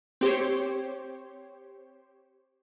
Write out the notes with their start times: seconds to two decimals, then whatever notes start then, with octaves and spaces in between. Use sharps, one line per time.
0.21 C4 G4 C5 C#5